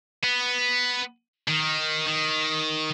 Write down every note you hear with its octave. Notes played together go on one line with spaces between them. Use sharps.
B3
D#3
D#3